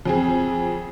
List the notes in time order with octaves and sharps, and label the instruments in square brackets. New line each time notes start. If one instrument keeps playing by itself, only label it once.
[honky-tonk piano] F2 C4 G#4